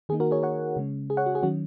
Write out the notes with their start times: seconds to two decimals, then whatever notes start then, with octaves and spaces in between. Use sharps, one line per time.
0.09 D#3 A#3 D#4 G#4
0.20 F#4 A#4
0.31 G#4 C#5
0.43 C#5 F#5
0.76 C#3 G#3 C#4
1.10 G#4
1.17 C#5 F#5
1.26 F#4
1.35 G#4
1.43 D#3 F#3 C#4 F#4